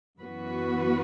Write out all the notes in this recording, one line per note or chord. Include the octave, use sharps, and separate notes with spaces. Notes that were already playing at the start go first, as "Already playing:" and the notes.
F#2 E3 B3 F#4 B4